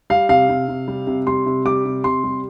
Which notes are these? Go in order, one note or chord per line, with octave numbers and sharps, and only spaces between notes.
G3 F5
C3 F5
C3
C3
G3
C3
G3 C6
C3
G3 D6
C3
C3 C6
G3